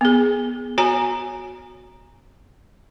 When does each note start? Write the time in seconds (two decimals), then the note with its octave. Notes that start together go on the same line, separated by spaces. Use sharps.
0.01 B3 G#4
0.78 F#4 C#5 G#5 A#5